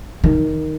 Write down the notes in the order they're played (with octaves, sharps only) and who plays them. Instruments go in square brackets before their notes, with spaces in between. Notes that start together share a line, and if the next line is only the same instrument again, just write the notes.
[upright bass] D#3